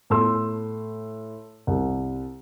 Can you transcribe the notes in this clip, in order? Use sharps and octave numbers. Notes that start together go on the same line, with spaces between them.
A2 A3 C6 E6
C2